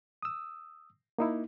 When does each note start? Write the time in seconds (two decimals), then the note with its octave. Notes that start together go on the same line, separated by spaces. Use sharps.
0.23 D#6 E6
1.18 A#3 D#4 E4